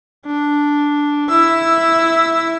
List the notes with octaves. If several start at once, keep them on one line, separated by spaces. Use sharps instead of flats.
D4
E4 E6